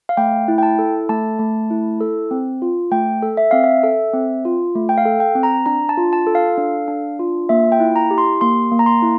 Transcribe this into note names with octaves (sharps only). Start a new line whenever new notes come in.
F5
A3 G5
E4
G5
A5
A4
A3 A5
A3
E4
A4
C4
F4
A3 G5
A4
E5
C4 F5
E5
A4
C4
F4
A3
G5
F5
A4
G5
C4
A#5
D4 A#5
A5
F4
A5
A4
F5
D4
D4
F4
A#3 E5
G5
E4
A#5
G4
C6
A#3 C6
A#3
A#5
C6
E4